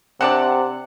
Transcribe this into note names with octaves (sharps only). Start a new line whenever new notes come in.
C3 C4 D4 D5 F#5